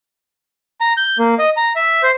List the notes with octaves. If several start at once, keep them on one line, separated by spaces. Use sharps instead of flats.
A#5
G6
A#3
D#5
A#5
E5
C5